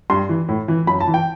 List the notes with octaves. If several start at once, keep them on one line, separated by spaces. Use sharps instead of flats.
G2 C6
E3
A2
E3
F#2 B5
A5
E3
G5